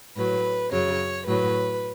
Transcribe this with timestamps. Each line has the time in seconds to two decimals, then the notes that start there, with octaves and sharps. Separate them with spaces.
0.15 A2 F#3 B4
0.70 F#2 C#3 F#3 C#5
1.26 A2 F#3 B4